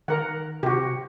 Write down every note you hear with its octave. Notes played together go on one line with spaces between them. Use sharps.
D#3 A#4 F#5
C3 F#4 G4